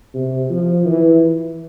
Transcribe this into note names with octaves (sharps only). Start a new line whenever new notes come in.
C3
F3
E3